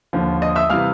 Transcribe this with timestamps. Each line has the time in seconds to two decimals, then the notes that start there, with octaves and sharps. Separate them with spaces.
0.13 D#2 D3 F3
0.42 D#5 D#6
0.55 E5 E6
0.70 C3 E3 G3 F5 F6